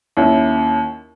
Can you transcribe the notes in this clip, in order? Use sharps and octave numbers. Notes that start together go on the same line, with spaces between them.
D#2 C#4 E4